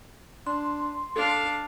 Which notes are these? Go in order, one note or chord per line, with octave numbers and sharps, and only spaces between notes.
D4 C6
D4 A4 F5